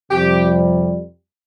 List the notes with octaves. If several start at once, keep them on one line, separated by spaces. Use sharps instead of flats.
F2 C3 G3 G4